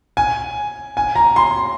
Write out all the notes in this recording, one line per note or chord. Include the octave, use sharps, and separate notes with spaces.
G#5
G#5
A#5
C6